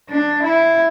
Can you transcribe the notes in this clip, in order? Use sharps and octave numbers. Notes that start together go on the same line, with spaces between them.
D4
E4